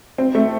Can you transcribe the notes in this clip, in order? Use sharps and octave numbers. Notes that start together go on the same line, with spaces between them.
C4
A3